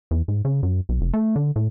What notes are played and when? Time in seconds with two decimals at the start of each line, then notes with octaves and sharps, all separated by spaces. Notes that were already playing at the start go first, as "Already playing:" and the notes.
0.11 E2
0.28 G#2
0.45 C#3
0.63 F#2
0.89 B1
1.01 F1
1.13 A3
1.36 D3
1.56 A2